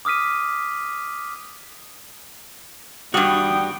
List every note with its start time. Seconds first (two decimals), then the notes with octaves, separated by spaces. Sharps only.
0.05 D6 D#6 F6 B6 D#7
3.14 G2 G3 F#4 G5 D#6